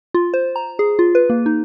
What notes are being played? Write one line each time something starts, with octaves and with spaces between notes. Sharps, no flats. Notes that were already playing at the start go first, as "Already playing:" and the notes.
F4
C5
A#5
G#4
F4
B4
A#3
D#4